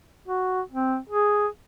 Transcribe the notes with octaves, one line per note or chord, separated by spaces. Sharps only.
F#4
C4
G#4